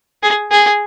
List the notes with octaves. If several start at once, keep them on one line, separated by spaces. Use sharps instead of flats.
G#4
G#4